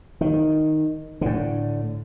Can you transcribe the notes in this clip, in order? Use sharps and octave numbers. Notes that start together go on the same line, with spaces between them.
D#3
A2 D3